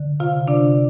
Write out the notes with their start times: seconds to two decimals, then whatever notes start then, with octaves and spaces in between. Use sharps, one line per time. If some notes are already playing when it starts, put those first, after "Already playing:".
Already playing: D3
0.20 C3 F4 F5
0.48 C3 D4 D5